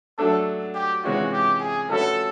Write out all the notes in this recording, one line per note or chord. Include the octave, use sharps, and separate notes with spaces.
F#3 A3 D4 A4
G4
C3 E3 G#3 C#4 F4 F#4
G4
G#4
F3 A3 C#4 F#4 A4 B4